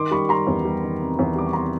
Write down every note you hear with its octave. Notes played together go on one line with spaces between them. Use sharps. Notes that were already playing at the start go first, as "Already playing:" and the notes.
Already playing: D#3 C6 D6
G3 B5 C#6
G3 A#5 C6
E2
G3
D#3
C3
E2
G3 D6
C#6
C3 A#5 C6